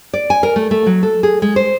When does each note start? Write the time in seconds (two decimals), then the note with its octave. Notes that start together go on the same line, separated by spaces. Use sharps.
0.14 D5
0.30 G#5
0.43 A#4
0.56 A3
0.71 A3
0.86 F#3
1.03 A4
1.23 G#4
1.42 G#3
1.56 C5